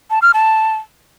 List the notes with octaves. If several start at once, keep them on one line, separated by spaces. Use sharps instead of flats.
A5
F6
A5